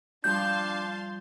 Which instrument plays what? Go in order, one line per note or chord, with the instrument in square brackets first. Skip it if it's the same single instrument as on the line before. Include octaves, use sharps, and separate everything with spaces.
[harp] F3 G3 [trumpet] D4 [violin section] F5 A5 C6 [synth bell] G6